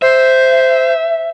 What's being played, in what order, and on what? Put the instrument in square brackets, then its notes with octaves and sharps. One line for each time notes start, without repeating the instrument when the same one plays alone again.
[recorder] C5 [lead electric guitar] E5